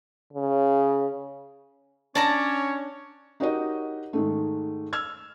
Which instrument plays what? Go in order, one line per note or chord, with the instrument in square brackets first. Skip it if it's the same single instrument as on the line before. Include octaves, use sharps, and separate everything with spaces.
[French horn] C#3
[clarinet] C#4 [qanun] D4 [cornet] C#5 [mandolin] D5 A5 A#5
[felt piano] D#4 F#4 G4 A#4 C#5 D#5
G#2 D#3 A3
E6 F6 G#6